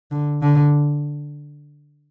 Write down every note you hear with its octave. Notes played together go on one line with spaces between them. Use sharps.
D3
D3